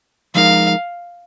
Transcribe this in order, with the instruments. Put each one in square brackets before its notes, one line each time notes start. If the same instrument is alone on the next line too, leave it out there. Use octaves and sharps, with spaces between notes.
[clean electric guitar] F3 G#3 D#4 A#4 [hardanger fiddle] F5